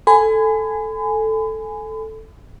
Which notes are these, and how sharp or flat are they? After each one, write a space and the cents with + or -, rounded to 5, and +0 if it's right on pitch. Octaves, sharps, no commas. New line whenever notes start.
A4 +0 G#5 +0 B5 +40